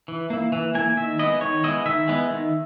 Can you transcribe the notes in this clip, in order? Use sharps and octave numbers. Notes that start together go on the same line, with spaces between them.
E3
A#3 E4
E3
A#3 E4 G#5
D#3 E5
G#3 B3 E4 D#5
D#3 C#5
G#3 B3 E4 D#5
D#3 E5
G#3 B3 E4
D#3